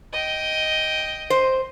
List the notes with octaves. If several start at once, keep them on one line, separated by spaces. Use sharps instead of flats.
D#5 G5
C5